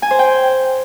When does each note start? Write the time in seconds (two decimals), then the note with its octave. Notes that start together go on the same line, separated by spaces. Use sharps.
0.02 G#5
0.11 C5
0.19 G5